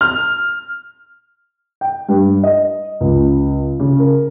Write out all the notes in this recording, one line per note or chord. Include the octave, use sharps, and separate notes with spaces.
F6
G5
G2
D#5
C#2
C#3
A#4